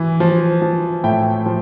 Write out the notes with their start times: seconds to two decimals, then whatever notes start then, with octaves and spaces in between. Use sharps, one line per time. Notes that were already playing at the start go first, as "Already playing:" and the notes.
Already playing: E3
0.20 F3
0.62 F3
1.04 A2 E5 G5
1.46 F3